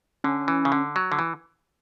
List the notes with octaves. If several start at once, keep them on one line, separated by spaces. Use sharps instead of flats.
D3 C#4
E3
C#3
D3
F#3
D3
E3